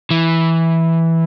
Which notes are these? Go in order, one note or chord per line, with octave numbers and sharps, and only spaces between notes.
E3